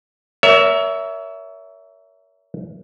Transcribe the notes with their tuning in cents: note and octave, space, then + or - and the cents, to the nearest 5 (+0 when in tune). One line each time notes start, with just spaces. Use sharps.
A#4 +0 C#5 +35 E5 +0